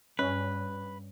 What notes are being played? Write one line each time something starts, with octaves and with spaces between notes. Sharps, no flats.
G2 C#4 B4